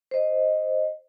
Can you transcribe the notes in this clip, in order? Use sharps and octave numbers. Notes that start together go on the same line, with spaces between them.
C5 D#5